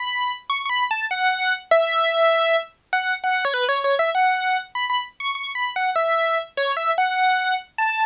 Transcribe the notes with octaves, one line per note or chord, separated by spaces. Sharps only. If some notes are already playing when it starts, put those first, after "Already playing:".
Already playing: B5
C#6
C#6
B5
A5
F#5
E5
F#5
F#5
C#5
B4
C#5
C#5
E5
F#5
B5
B5
C#6
C#6
B5
F#5
E5
C#5
E5
F#5
A5